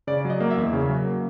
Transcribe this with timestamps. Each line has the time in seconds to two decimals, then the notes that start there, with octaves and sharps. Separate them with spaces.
0.07 C#3 D5
0.25 F#3
0.30 D#5
0.40 A#3
0.51 E5
0.57 E2
0.73 C#3
0.89 F#3
1.05 A#3